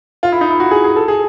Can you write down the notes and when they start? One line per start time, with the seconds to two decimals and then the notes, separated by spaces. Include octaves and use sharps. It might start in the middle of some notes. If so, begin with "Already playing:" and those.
0.23 F4
0.32 E4
0.41 D#4
0.50 E4
0.60 F#4
0.71 G#4
0.84 G#4
0.96 A4
1.08 G#4